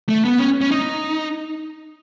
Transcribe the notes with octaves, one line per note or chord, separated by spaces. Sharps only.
A3
B3
C#4
C#4
D#4